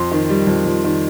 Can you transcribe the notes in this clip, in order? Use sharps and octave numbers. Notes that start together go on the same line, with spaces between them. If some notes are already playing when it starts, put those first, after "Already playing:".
Already playing: F2 C6
D#3
G3
F2
F2
D#3